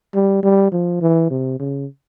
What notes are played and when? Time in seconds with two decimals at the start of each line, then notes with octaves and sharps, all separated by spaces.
0.14 G3
0.43 G3
0.72 F3
1.01 E3
1.30 C3
1.59 C#3